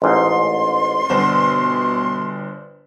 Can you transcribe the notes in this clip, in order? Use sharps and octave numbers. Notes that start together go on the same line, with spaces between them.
A1 G#2 C6
G1 B2 D4 F#4 C5